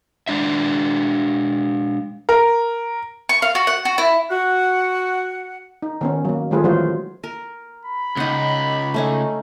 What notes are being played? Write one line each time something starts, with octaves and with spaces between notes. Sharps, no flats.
G#3 D4 E5
A#4
C#6
F5
F#4
F#5
F#4
E4
F#4 F#5
D#4
D#3 B3 C#4
F#3 A#3
D#3 G3 A3 F4 G#4 B4
E3 F#3 G#3 F4 F#4 C5
A#4
B5
C#2 D#4 F#5
A3 C#4 D#4